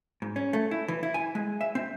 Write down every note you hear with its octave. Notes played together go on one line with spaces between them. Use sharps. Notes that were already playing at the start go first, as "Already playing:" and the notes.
G#2
C#4
A3
E4
E3
E4
G#5
G#3
E5
C4